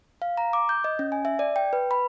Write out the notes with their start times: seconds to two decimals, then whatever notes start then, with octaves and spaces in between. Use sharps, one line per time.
0.22 F5
0.37 A#5
0.53 D6
0.69 G6
0.84 D#5
0.99 C#4
1.12 G#5
1.25 E5
1.39 D5
1.56 G5
1.73 B4
1.91 B5